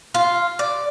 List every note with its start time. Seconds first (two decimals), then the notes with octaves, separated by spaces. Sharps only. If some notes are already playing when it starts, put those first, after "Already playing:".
0.14 F4
0.59 D5